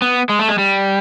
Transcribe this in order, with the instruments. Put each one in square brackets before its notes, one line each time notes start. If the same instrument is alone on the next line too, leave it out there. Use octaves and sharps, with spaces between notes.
[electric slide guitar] B3
G#3
A3
G#3
G3